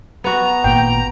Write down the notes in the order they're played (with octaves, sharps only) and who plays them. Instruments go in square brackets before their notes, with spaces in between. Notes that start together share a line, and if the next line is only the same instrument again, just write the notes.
[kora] B3 F#4 [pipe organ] A#5
[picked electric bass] G#1 A#2 [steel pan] G5